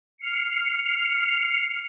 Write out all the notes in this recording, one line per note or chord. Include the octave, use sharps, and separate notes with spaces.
F6 C7 C#7